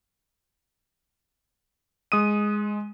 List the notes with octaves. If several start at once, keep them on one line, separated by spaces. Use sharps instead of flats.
G#3 D#6 D#7